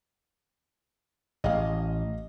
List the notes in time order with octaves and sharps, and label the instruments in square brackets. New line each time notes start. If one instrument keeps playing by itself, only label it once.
[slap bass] A1 [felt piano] D#5 F5